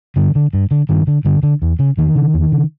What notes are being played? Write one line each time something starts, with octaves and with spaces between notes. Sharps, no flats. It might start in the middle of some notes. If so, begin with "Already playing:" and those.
G2 D3
D3
G2
D3
G2 D#3
D3
G2 D3
D3
E2
C#3
E2 D#3
C#3
E2
C#3